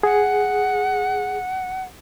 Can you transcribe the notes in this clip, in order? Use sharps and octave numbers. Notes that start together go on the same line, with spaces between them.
G#4 F#5